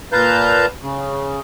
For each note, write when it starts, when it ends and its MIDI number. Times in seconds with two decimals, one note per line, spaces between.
0.12 0.66 46
0.12 0.66 71
0.12 0.66 77
0.12 0.66 81
0.12 0.66 82
0.12 0.66 91
0.81 1.40 49